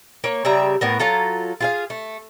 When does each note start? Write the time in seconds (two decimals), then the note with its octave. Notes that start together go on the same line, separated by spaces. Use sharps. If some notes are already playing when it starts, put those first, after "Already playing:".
0.24 A#3 C#5
0.45 C#3 G3 E5 A#5
0.81 A2 B3 A#4
0.99 F#3 F4 A4 A#5
1.61 F4 G#4 F5
1.90 A3